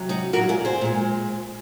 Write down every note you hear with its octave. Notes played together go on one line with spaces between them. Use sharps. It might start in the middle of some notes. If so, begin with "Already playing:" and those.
Already playing: C3 F#3
D#4 F#4
A#2 F#3 F#4 A#4
F4 G#4
G#4 C5
A#2 G#3